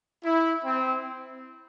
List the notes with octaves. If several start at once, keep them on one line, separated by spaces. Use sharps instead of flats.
E4
C4